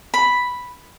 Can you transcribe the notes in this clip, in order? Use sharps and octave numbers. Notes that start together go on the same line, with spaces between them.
B5